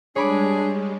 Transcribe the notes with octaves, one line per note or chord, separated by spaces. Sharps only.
G3 G#3 D4 G#4 C#5 B5 D6